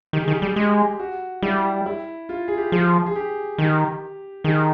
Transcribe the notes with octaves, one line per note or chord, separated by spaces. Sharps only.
D#3 G4
D#3 G#4
G4
G3
G4
G#3 G4
F#4
G3 E4
E4
F4
G#4
G4
F3 G#4
G#4
G4
D#3 G4
D#3 G#4